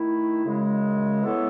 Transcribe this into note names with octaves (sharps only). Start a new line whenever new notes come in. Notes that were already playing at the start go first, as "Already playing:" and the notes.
Already playing: D#3 A3 E4
F#2 C#3 G#3
E3 B3 E4 A4 C#5